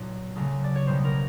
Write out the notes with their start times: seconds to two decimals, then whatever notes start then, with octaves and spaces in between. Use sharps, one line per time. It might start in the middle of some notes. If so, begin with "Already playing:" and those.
Already playing: B1 A#2 F#3
0.36 D2 C#3 F#3 A3
0.64 D5
0.75 C#5
0.87 B1 B2 G3 A#3 C5
1.04 A#4